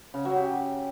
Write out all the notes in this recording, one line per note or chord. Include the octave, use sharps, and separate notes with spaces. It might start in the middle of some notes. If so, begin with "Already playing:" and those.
C#3
F#3
G4